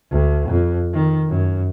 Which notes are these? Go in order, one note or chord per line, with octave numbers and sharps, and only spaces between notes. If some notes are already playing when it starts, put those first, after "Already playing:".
D2
F2
D#3
F#2